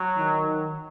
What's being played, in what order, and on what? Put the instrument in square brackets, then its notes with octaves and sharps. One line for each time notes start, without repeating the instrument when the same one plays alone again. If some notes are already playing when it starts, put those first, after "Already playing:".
Already playing: [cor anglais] F#3
[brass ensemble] D#3